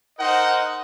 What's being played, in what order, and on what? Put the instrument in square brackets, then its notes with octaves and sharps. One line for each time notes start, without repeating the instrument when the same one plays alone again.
[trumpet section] D#4 A#4 C5 D#5 F#5